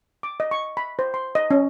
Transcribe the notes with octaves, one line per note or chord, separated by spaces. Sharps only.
D6
D#5
C#6
B5
C5
C6
D#5
C#4